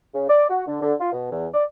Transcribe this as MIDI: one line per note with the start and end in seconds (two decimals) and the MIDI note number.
0.15 0.26 49
0.30 0.46 74
0.50 0.67 66
0.67 0.81 50
0.82 0.94 50
1.01 1.09 65
1.13 1.28 47
1.32 1.48 40
1.54 1.64 74